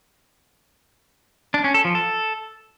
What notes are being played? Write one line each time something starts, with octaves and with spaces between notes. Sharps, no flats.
D4
C#4
A4
F3
A4